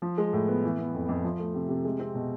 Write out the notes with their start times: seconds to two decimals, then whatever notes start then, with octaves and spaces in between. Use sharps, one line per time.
0.02 F3
0.18 G#3
0.33 A2
0.48 B3
0.64 E3
0.79 B3
0.94 F2
1.09 F2
1.24 F3
1.39 A3
1.54 C3
1.69 C3
1.85 G#3
1.99 C4
2.15 B2